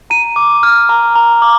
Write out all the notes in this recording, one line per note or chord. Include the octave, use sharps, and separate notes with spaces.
A#5 D#7
D6
F6
A#5
A#5
D6